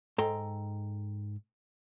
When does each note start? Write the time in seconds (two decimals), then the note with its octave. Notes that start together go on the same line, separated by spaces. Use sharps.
0.18 G#2 A4 G5 A#5 C6